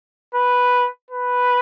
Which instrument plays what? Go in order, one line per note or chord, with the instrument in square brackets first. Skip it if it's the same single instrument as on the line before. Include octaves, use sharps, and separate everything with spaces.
[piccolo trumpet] B4
B4